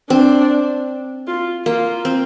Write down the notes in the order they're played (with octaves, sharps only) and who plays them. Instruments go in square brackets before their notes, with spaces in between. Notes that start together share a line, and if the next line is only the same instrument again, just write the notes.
[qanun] C4 [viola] D4
[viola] F4
[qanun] A#3 [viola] F4
[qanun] C4